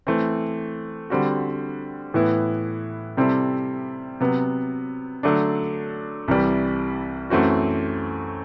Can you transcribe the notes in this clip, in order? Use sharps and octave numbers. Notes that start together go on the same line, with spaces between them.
E3 A3 C4
D3 G3 C4 F#4
A2 E3 B3 E4
C3 G3 C4 E4 A4
C3 F#3 B3
D3 F#3 A3 D4
C2 C3 E3 G3
F#2 E3 A3 C4 F#4